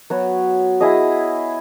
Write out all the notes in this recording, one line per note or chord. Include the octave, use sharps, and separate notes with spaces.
F#3 B3 F#4 C#5
E4 G#4 D#5